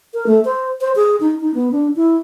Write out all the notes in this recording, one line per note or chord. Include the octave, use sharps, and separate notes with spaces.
A#4
A3
C5
C5
G#4
D#4
D#4
B3
D4
E4